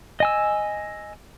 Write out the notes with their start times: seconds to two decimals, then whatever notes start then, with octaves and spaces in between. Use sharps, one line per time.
0.20 D#5 G#5 E6